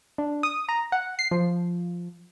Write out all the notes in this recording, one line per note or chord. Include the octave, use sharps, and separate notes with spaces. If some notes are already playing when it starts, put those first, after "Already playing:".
D4
D#6
A#5
F#5
C7
F3